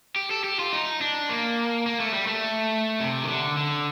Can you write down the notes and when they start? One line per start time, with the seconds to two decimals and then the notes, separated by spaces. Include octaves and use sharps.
0.16 G4
0.31 A4
0.44 G4
0.59 F4
0.73 D#4
1.01 D4
1.29 A#3
1.86 A#3
2.00 A3
2.14 G3
2.27 A3
3.00 C3
3.23 D#3
3.28 D3
3.57 D3